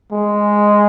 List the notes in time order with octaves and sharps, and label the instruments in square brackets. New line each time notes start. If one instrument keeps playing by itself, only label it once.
[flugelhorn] G#3